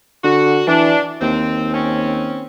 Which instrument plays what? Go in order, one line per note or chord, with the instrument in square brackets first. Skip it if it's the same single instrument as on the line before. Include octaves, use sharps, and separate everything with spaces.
[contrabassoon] D3 [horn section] F#4
[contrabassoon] E3 [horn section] D4
[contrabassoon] D#2 [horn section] C4
[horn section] C4 C#4